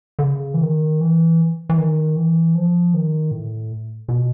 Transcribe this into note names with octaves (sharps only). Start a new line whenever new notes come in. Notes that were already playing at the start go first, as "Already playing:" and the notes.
D3
C#3
E3
D#3
E3
E3
D#3
E3
F3
D#3
A2
B2